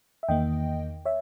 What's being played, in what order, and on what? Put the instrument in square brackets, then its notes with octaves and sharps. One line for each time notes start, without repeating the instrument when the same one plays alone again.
[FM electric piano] E5
E2 D#3 A#3 D#5 G5
C#5 E5